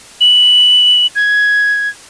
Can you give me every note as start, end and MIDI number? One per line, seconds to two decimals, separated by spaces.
0.21 1.07 102
1.15 1.89 92